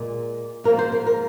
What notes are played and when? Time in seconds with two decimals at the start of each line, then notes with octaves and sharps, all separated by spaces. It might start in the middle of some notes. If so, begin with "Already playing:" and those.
Already playing: A#2 G#3
0.64 G#2 F3 A#3 A#4
0.79 C5
0.92 A#4
1.06 A#4